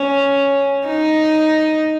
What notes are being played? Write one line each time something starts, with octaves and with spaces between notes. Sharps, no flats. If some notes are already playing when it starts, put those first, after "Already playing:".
Already playing: C#4
D#4